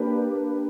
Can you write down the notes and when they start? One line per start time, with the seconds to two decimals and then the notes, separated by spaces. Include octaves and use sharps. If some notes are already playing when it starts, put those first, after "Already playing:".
Already playing: A#3 D4 G4 B4